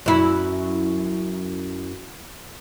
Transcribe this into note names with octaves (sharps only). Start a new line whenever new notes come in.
F#2 E4